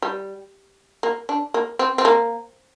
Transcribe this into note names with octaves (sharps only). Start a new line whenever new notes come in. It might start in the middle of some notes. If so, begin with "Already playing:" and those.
G3
A#3
D4
A#3
C4
C4
A#3